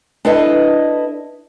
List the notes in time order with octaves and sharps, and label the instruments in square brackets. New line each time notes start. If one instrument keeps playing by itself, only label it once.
[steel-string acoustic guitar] D4 E4 A4 B4 D#5